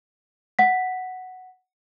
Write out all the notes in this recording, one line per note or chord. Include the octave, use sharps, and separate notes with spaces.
F#5 B6